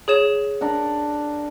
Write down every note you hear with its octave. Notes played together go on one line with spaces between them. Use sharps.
G#4 C#5 E7
D4 A#4 F#5